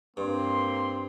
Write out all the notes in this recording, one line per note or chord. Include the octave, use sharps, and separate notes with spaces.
G2 A#3 C4 C6